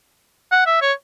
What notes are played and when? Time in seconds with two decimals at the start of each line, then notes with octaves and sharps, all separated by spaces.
0.52 F#5
0.66 E5
0.82 C#5